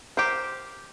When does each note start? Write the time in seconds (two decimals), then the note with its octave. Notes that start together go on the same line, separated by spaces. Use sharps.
0.17 G4 A#4 C5